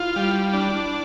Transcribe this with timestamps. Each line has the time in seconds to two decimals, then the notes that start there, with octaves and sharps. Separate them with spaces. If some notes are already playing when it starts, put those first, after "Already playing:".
Already playing: E4 F4
0.16 G3
0.53 D4